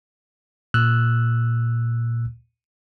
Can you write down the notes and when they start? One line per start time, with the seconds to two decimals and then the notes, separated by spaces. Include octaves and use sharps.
0.74 A#2 E6 F#6